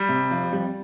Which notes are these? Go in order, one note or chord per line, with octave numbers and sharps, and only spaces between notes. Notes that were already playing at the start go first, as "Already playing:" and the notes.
Already playing: G3
C3
F2
G3